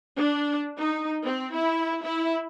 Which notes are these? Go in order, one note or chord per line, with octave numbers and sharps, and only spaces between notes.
D4
D#4
C4
E4
E4